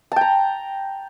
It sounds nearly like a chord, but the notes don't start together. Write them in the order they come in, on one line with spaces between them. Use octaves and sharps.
A5 G5 A#5